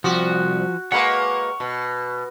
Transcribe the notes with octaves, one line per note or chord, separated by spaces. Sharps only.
C2 F3 F#4 G4
G#3 A#3 B4 C#5 F#5
B2